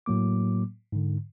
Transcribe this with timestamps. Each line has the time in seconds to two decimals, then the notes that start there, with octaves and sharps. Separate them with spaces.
0.06 A2 F#3 A#3 D6
0.92 G#2 D3